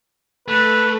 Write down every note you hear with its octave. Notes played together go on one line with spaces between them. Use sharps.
A3 B4